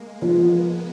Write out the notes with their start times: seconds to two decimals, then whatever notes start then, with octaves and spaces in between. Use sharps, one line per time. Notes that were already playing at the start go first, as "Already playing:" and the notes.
Already playing: G#3 A#3
0.21 F3 B3